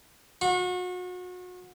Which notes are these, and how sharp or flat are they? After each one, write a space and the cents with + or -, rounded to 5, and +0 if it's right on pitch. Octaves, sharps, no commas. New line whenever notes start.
F#4 -35